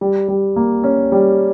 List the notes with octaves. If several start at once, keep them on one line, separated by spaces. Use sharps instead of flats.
G3
G3
A#3
C#4
G3